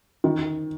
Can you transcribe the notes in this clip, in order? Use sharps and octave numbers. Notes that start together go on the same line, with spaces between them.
D#3